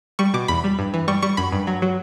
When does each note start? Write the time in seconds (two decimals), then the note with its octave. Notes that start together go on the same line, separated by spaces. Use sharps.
0.19 G3 C#6
0.34 B2 D6
0.48 E2 B5
0.64 G3
0.79 G2
0.94 E3
1.08 G3 C#6
1.22 G3 C#6
1.37 F#2 B5
1.52 G2
1.67 F#3
1.82 F#3